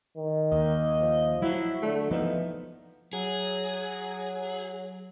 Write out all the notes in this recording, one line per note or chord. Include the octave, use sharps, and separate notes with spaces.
D#3
D#2 D#5
F3
F#3 E4
D3 A3
E3 F3 B3 D#4
F#3 G#4